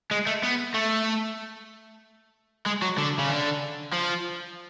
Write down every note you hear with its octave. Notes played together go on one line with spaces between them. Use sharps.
G#3
A3
B3
A3
G#3
F#3
D3
C#3
D3
F3